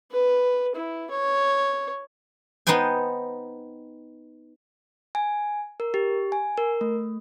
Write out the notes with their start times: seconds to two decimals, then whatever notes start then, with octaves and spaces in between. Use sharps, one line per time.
0.11 B4
0.75 E4
1.11 C#5
2.67 B3 D#4 C5 G5 G#5
5.15 G#5
5.80 A#4
5.94 G4
6.32 G#5
6.57 A#4
6.81 A3